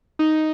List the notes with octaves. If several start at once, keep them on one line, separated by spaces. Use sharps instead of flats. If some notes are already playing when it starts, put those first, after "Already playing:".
D#4